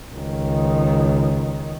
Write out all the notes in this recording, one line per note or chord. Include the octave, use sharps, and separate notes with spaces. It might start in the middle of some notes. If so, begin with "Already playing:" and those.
C#2 D#3